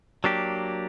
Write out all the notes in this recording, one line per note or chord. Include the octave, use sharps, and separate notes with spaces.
F#3 A#3 D4 G4